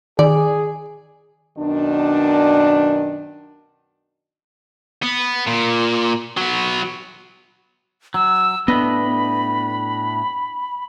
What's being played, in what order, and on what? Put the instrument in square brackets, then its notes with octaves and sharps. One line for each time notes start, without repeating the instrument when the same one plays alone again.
[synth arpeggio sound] D#3 [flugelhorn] G#4 [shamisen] D5
[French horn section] F#2 B2 D#3 D4
[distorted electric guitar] B3
A#2
F#3 B3
[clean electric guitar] F#3 [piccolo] E6
[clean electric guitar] A2 D4 D#5 [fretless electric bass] B3 [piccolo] B5